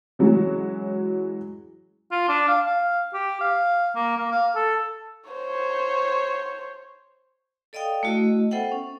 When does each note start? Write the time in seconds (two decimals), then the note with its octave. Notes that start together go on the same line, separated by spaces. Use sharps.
0.19 E3 F#3 G#3 C#4 F#4
2.12 F4
2.29 D4
2.48 F5
2.66 F5
3.14 G4
3.41 F5
3.95 A#3
4.17 A#3
4.32 F5
4.56 A4
5.30 C5 C#5
7.73 A4 D5 D#5 F5 G5 D#6
8.03 A3 E4 F#4 D#5
8.51 B3 A4 C5 E5 F#5 G5
8.72 C#4